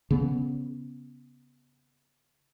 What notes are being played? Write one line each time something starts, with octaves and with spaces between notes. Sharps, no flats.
C#3 B3